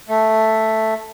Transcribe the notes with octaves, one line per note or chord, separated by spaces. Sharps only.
A3